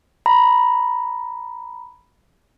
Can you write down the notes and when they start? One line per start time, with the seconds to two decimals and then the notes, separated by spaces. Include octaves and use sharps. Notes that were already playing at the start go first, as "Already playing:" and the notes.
0.26 A#5 B5